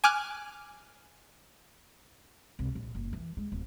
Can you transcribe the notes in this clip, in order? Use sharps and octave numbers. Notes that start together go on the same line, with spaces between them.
G#5 D6 F6 F#6
C2
A#1
F#1
E3
G#3
D1